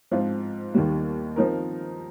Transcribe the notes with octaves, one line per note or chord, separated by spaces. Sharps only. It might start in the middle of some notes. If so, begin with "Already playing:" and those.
G#2 F3 C4 F4
D#2 D#3 G3 A#3
F3 C4 D#4 A#4